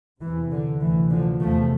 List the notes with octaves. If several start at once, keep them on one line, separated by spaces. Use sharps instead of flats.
E2 C3 E3
D3
D2 C3 E3
D3 F3
E2 C3 F3 A3